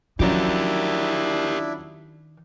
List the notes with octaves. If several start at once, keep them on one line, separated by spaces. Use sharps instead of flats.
D#3 F3 F#3 C#4 D4 E4 G4 A#4